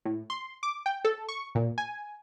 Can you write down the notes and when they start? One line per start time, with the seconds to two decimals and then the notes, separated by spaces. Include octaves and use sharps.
0.05 A2
0.30 C6
0.63 D6
0.86 G5
1.05 A4
1.29 C#6
1.55 A#2
1.78 G#5